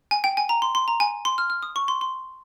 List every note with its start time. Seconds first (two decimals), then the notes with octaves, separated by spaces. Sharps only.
0.11 G#5
0.24 G5
0.37 G#5
0.49 A#5
0.62 C6
0.75 C6
0.88 A#5
1.00 G#5
1.25 C6
1.38 F6
1.50 F6
1.63 D#6
1.76 C#6
1.88 C6
2.01 C6